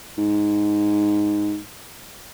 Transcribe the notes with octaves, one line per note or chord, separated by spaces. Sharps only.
G#2